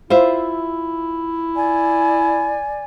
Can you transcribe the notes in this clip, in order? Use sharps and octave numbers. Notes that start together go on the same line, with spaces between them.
E4 F4 C5 E5
D5 G#5